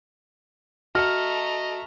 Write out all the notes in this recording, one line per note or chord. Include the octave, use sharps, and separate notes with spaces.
A3 F#4 D#5 A#5 F6